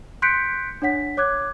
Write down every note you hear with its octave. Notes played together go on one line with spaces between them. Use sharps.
C6 F#6 G6 B6 C#7 D7
D4 C#5 F#5 B6
C#5 D6 F#6 G#6